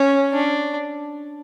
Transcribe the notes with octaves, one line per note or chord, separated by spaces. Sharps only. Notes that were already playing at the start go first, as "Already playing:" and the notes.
Already playing: C#4
D4